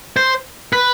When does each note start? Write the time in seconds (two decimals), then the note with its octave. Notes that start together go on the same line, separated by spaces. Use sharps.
0.17 C5
0.73 B4